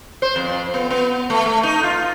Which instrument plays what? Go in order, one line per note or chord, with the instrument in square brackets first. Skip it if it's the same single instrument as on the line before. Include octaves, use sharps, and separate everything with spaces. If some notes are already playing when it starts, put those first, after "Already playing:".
[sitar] C5
F2
B3
B3
A3
A3
D#4
F4